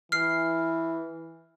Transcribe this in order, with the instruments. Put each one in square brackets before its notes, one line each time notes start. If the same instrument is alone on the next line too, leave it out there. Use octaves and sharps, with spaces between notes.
[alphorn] E3 [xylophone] F6 C7